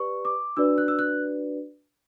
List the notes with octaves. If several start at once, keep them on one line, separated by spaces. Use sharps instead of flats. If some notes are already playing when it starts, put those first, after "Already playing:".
Already playing: G4 B4 D5 C#6
D6
D4 F#4 B4 D5 E6
F#6
E6
F#6